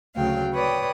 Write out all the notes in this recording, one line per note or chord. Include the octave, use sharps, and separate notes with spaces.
D2 C#3 F#3 F5 G5
B4 C#5 D5 G5 D#6